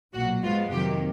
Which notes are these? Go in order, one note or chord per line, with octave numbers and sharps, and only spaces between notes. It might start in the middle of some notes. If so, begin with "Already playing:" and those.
B1 A#2 F#3 F#4
G#2 F3 G#3 B3 F4
F2 C3 D#3 F#3 A#3 G4